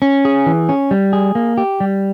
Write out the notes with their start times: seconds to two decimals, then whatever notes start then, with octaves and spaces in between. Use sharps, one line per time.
0.02 C#4
0.25 G#4
0.46 E3
0.69 C#4
0.91 G3
1.13 G#4
1.35 A#3
1.58 G4
1.80 G3